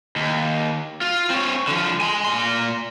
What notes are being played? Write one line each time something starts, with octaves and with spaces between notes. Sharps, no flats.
D#2
F4
C4 C#5
D3 F3
G#5 C6
A#2 C6